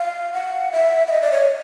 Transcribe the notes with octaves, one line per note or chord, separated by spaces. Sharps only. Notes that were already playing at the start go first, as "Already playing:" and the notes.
Already playing: F5
F#5
E5
E5
D#5
D5
C#5